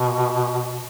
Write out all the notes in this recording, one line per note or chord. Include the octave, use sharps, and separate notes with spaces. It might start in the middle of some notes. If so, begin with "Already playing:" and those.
Already playing: B2